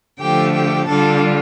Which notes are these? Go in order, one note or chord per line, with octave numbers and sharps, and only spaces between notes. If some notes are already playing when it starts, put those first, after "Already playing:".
D3 F3 A3 G4 G5
G4 G5
D3 G3 D4 F4 A4 A5